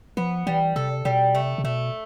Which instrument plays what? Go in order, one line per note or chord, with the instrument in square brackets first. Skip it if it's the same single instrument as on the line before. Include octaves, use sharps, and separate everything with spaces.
[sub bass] F3 [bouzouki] B3
[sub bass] E3 [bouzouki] G3
[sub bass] C3 [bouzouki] A4
[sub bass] B2 [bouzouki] G3
[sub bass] C3 [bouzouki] A3
[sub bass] C3
[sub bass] B2 [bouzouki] A3